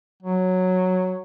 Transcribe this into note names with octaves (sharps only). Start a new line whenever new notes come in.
F#3